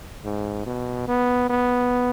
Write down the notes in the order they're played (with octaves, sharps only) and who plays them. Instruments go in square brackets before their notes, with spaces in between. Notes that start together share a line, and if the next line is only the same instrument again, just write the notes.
[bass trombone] G#2
B2
B3
B3